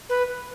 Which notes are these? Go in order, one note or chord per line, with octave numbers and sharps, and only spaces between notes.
B4